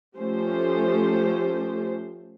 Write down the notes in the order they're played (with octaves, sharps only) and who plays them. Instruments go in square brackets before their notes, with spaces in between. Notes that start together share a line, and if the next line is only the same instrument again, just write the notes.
[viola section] F3 A3 C#4 G4 A4 C5